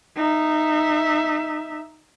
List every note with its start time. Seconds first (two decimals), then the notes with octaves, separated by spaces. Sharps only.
0.17 D#4 E5